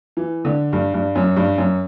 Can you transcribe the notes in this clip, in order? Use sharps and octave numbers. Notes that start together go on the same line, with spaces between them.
E3
D3
G2
G2
F#2
G2
F#2